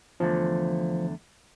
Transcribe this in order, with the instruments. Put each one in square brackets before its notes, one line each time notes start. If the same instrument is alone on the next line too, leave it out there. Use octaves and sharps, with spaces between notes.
[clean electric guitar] E2 D3 A3 [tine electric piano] F3